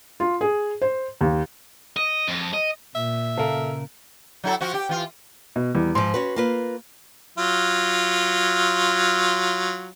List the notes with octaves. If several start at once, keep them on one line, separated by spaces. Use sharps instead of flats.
F4
G#4
C5
D#2
D#5
F2
D#5
A#2 E5
C#3 A4 A#4 F5
F#3 E4 A4
F3 F#4
G4
E3 F4
B2
E2 G3
G#2 F3 C6
C#4 F#4 B4
A#3 F4 B4
F#3 F4